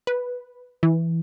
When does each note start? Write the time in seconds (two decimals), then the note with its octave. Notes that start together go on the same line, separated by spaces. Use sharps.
0.07 B4
0.83 E3